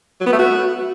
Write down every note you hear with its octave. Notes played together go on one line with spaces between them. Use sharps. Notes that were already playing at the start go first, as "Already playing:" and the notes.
F#3
B3
A3
F#4